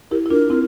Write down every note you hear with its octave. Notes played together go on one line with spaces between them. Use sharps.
E4 G4 A#4
E4
D4 F4 A#4
C4 E4